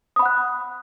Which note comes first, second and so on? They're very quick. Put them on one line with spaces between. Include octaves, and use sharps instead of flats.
D#6 B5 F#5 F#6